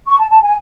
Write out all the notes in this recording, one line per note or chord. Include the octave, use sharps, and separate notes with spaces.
C#6
A5
A5
G#5